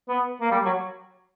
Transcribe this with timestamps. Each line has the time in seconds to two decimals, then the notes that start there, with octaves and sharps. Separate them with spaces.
0.09 B3
0.41 A#3
0.51 G3
0.66 F#3